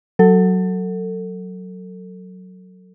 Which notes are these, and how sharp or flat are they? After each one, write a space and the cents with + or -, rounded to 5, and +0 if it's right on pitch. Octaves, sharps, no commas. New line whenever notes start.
F#3 +0 A4 +25